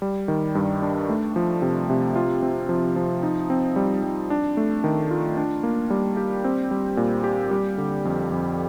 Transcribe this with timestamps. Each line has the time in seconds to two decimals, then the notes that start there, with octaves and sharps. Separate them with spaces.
0.02 G3
0.28 D#3
0.55 G2
0.82 D4
1.09 A3
1.36 F3
1.62 C3
1.90 C3
2.16 F4
2.42 C4
2.69 F3
2.96 F3
3.23 D#4
3.50 C4
3.76 G3
4.03 G3
4.30 D4
4.57 A3
4.84 D#3
5.11 F4
5.37 D4
5.63 A#3
5.90 G3
6.17 G4
6.44 C4
6.71 G3
6.97 A#2
7.24 G4
7.51 G3
7.78 D3
8.05 F2
8.32 F2